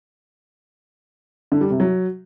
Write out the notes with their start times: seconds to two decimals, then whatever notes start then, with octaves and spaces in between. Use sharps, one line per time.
1.52 D3
1.61 G3
1.70 C3
1.80 F#3